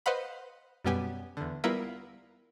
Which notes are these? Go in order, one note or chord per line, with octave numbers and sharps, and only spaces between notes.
B4 C5 D#5 F5 F#5 B5
F#2 B2 G3 B3 G4 G#5
E2 D3
G3 B3 E4 F4 A#4 B4